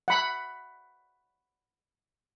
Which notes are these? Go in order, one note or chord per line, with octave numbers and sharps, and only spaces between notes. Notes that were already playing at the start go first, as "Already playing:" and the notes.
F#5 B5